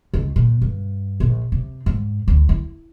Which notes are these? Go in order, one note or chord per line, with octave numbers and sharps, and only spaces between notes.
C#2
A#2
G2
A#1
C3
G#2
D2
E4